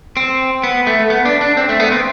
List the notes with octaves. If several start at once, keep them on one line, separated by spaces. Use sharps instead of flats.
C4
B3
A3
B3
D4
D4
C4
A3
B3
C4